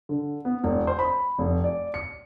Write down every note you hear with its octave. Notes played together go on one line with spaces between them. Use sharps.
D3
B3
E1
C5
B5
F1
D5
C#7